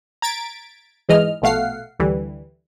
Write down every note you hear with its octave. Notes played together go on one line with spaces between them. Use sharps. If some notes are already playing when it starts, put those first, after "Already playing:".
A#5 G#6 A6 B6 D7
G#2 E3 G#3 D#5 F6
A#1 B2 A3 F5 F#5 C7
D2 D3 E3 G3